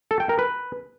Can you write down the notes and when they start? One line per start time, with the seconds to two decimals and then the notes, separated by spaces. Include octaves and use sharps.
0.11 A4
0.20 G5
0.29 A#4
0.39 B4